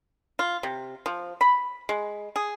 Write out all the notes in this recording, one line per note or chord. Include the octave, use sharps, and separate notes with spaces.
F4
C3
F3
B5
G#3
G#4